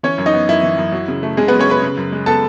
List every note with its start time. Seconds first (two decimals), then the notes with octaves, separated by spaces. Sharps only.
0.03 E3 C#4 C#5
0.18 F#2
0.26 D#4 D#5
0.34 B3
0.48 F#2 E4
0.63 E3
0.78 F#2
0.92 F#3
1.08 C#3
1.23 A3
1.37 C#3 G#3 G#4
1.48 F#3 B3 B4
1.59 C#4 C#5
1.67 C#3 B4 B5
1.82 C#3
1.97 F#2
2.12 G#3
2.26 B3 A4 A5